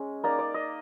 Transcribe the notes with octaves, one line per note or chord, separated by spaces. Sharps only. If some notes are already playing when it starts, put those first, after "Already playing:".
Already playing: G#3 C#4
A#3 D#4 D5
D5
D#5